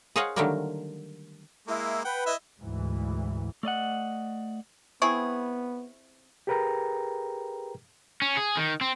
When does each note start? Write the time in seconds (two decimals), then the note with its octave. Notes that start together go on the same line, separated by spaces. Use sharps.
0.16 G#4 C5 C#5 D#5 F5 F#5
0.36 D3 D#3 F#3 G3 A3 A#3
1.68 G#3 A#3 E4
2.05 B4 F#5 G5
2.26 E4 D#5 E5
2.62 D2 G#2 E3
3.63 A3 D5 D#5 F#5
5.02 B3 C4 E4 G#4 C#6
6.47 G4 G#4 A#4 B4 G5 A#5
8.22 C#4
8.37 G#4
8.57 D#3
8.81 C4